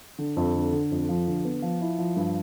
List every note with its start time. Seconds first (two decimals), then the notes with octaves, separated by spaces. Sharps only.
0.19 D3
0.37 F2
0.55 D3
0.72 D3
0.91 F2
1.09 F3
1.27 D3
1.45 B3
1.62 F3
1.81 E4
1.98 F3
2.16 G2